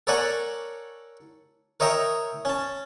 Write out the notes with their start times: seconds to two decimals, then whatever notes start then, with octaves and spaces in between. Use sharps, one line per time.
0.07 A4 A#4 C#5 D5 F#5 G#5
1.80 A#4 C#5 D#5 E5 G5 A#5
2.45 C#4 A5